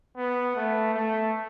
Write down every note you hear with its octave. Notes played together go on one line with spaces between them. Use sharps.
B3
A3
A3